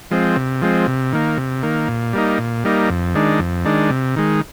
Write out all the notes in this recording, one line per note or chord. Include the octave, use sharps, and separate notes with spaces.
F3 G#3 C4
C3
F3 G#3 C4
C3
D#3 A#3
C3
D#3 A#3
A#2
G3 A#3 D#4
A#2
G3 A#3 D#4
F2
D#3 G#3 D4
F2
D#3 G#3 D4
C3
D#3 G#3